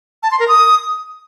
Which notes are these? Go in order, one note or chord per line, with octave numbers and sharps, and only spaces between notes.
A5
C6
A#4
D#6